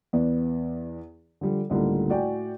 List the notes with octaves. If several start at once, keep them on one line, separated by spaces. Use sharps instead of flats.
E2 B3 D5
D3 F3 G3
C#2 A2 D3 G3 A#3
A2 F#4 D5 G5 G#5